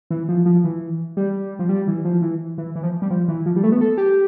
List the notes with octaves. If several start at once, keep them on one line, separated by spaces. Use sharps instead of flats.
E3
F3
F3
E3
G3
F3
G3
E3
F3
E3
E3
E3
F3
G3
F3
E3
F3
G3
A3
B3
A4
G4